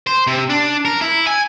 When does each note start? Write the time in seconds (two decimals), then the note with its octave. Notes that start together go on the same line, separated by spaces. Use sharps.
0.07 C5
0.27 C3
0.50 D4
0.85 A#4
1.01 E4
1.27 G#5